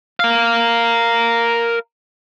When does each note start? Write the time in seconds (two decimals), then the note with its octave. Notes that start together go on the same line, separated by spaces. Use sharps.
0.20 A#4 F5